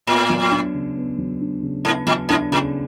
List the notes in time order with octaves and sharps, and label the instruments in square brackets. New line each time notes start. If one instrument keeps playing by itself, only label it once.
[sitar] A2 [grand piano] B3
[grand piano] F#3
D4
C#3
B3
F#3
D4
C#3
[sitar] G#2 [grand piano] B3
[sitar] A2 [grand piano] F#3
[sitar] G#2 [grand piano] D4
[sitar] A2 [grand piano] C#3